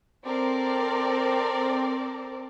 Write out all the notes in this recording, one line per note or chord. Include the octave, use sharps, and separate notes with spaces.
C4 A4 A#4 C5 D5